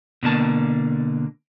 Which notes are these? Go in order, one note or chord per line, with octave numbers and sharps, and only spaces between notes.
B2 D3 A#3 A5